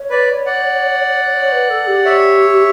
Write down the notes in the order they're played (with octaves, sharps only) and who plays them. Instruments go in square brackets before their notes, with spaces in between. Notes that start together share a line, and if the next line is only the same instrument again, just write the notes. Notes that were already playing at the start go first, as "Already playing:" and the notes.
Already playing: [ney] C#5
[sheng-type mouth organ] B4 D5
D5 F#5
[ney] C#5
B4
A4
G4
[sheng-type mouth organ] C#5 E5